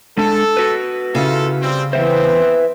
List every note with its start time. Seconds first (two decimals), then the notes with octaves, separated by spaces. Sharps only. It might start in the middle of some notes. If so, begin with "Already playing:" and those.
0.17 G#3 D4 A4
0.57 F#4 B4
1.15 C#3 E4 F4 A4
1.62 G3 C4
1.93 E2 D#3 E3 B3 C4 C5 E5